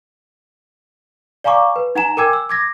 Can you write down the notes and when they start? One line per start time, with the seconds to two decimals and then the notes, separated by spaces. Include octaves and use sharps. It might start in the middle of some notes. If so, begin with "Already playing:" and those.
1.44 D5 F5 G#5 A#5 C#6 D6
1.76 B4
1.95 D#4 F#5 G#5 A#5 E7
2.17 A#4 G5 G#5 D6 E6 G#6
2.33 E6
2.49 D6 G#6 A#6